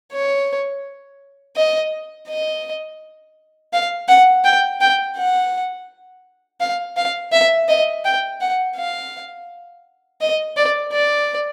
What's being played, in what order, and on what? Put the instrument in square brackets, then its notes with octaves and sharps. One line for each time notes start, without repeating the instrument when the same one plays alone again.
[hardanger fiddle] C#5
D#5
D#5
F5
F#5
G5
G5
F#5
F5
F5
E5
D#5
G5
F#5
F5
D#5
D5
D5